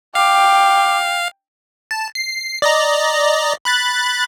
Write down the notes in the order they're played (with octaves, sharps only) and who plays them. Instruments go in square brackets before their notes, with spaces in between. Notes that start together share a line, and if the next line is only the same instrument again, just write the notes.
[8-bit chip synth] F5 [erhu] G5 [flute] D6
[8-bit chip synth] A5
C7
D5 D#5 A#5
B5 F#6 A6